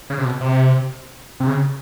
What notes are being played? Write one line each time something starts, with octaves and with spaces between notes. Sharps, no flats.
C#3
C3
B2
C3
C3
C#3